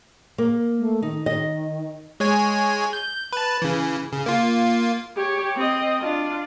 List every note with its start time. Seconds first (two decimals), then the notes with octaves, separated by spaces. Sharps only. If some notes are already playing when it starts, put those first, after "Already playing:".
0.38 A#3
0.78 A3
1.02 D#3 D#4
1.26 D#3 D#5
2.20 G#3 C#5 G#5
2.93 G6
3.33 B4 A5
3.62 C#3 E3
4.12 C#3
4.26 A#3 F4
5.16 G4 C#5
5.56 C4 D#5
6.00 D4 F4